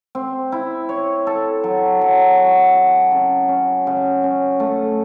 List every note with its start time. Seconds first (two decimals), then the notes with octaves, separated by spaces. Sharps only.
0.15 C4
0.52 E4
0.89 C#5
1.27 A4
1.64 F#3
2.01 F#3
2.37 F#4
2.75 F#4
3.11 C#3
3.49 C#4
3.87 C#3
4.24 C#4
4.60 A3